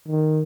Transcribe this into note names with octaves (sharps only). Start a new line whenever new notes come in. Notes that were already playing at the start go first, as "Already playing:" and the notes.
D#3